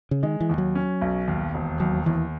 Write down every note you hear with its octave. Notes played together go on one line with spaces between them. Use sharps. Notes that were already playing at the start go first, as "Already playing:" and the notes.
C#3
D#3 G#3
E3
D#2
F#3
C#4
B1
D#2
E1
D#2 F#3
D#2 E3